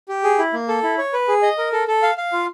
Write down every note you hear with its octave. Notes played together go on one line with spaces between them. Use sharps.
G4
G#4
E4
A#3
A4
E4
C#5
B4
G#4
D#5
A#4
A4
A4
F5
F5
F4